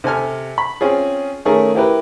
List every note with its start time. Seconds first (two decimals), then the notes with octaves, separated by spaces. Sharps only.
0.04 C3 A4 G#5 F6
0.58 B5
0.81 C4 C#4 F4 G#4
1.45 D#3 A3 C#4 G#4 A#4
1.75 E4 G4 A#4 B4